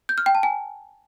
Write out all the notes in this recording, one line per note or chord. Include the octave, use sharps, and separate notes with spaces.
G6
F6
G5
A5
G#5